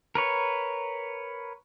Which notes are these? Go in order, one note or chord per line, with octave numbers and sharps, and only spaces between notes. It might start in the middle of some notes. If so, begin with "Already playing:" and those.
A#4 B4 C#5